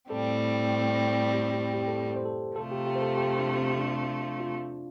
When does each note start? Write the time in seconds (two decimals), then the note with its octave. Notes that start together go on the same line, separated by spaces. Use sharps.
0.10 A2 G3 C4 A4
1.34 G4
1.53 G4
1.74 G4
1.88 A4
1.94 G4
2.16 C5
2.25 A4
2.56 C3 F3 A3 A4
2.71 G4
2.86 G4
2.96 C5
3.02 A4
3.17 G4
3.38 D4
3.59 C4
3.78 D4
4.40 F4